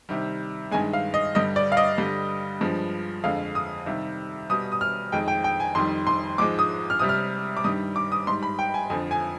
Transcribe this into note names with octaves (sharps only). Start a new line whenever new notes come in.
C3 D#3 G3
G2 D#3 G#3 G#5
F5
D#5
G2 D3 G3 D#5
D5
F5
D#5
G2 D3 G3
G2 F3 G#3
F2 D3 G#3 F5
D#6
C3 D#3 G3
B2 G3 D#6
D#6
F6
F2 D#3 G#3 G5
G5
G5
G#5
F2 D#3 G3 C6
C6
G#2 F3 G#3 D6
D#6
F6
C3 G3 D#6
F6
D6
G2 D#3 G3 D#6
D6
D#6
G#2 G3 C6
B5
G5
G#5
F2 D3 F3 G#5
G#5